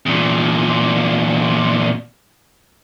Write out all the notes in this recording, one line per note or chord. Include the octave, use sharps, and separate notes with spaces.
E2 A#2